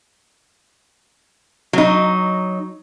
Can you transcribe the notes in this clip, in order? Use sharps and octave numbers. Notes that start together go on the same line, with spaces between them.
F#3 D#4